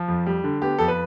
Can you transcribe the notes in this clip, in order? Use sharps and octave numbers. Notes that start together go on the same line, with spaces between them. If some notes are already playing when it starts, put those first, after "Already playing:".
Already playing: F3
F2
G3
D3
B3 G4
F2 A4
B4